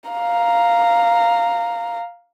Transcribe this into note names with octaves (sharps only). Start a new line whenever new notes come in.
F5 A#5